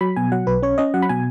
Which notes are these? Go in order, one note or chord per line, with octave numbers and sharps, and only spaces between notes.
F#3 B5
B2 G#5
F#3 F#5
B1 B4
C#4 C#5
C#4 D#5
F#3 F#5
B5
B2 G#5